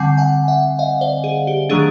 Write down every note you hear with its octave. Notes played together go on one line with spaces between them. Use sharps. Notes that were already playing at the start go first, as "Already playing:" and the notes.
Already playing: D3 G3 C4 F#5 G#5
F#5 G#5
E5 F#5
D#5 F5
C5 D5
G#4
G4
D#3 F#3 A3 D4 G#4